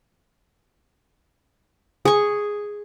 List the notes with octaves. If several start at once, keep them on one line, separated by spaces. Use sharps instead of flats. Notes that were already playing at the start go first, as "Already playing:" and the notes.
G#4 C#6